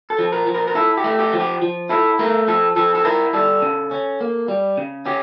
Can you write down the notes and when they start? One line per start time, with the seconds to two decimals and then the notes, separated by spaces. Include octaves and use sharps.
0.10 A4
0.19 F3
0.32 A#4
0.46 F3
0.54 A#4
0.68 A#4
0.75 E4 A4
0.97 G4
1.04 A3
1.19 G4
1.33 F3
1.40 G4
1.62 F3
1.89 E4 A4
2.19 A3 A#4
2.48 F3 A4
2.76 F3 A4
2.95 A4
3.05 E4 A#4
3.33 G3 A4
3.62 C#3
3.91 C#4
4.21 A#3
4.48 G3
4.77 C#3
5.06 C#4 G4